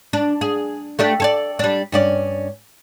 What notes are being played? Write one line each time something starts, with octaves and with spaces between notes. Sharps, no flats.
D4
G#4
A3 D4 G4
A4 C#5 D5
G3 D4
G2 C#4 D5